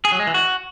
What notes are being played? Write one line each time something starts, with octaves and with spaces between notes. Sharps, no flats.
G#4
F#3
G#3
E3
F#4